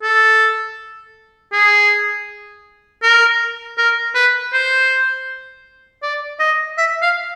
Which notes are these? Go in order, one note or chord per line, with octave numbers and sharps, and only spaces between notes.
A4
G#4
A#4
A#4
B4
C5
D5
D#5
E5
F5